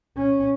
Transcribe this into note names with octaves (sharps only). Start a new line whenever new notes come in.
C#4